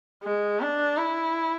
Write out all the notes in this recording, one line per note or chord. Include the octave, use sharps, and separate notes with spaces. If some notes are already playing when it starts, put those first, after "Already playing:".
G#3
D4
E4